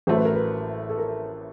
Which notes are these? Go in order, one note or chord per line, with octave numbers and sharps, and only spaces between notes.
A1 A2 F#3 A3 C5
B4
A#4
B4
A4
A#4